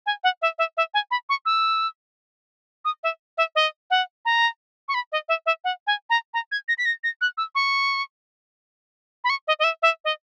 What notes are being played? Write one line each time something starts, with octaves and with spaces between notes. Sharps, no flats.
G#5
F#5
E5
E5
E5
G#5
B5
C#6
E6
D#6
E5
E5
D#5
F#5
A#5
C#6
B5
D#5
E5
E5
F#5
G#5
A#5
A#5
G#6
A#6
B6
A#6
A#6
F#6
E6
C#6
B5
C#6
D#5
D#5
E5
E5
D#5